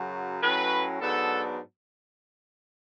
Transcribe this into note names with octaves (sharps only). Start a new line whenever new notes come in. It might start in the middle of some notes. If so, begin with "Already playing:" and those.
Already playing: F#2 C#3 F#3
A2 F#3 C#4 B4
G#2 F#3 B3 D4 A4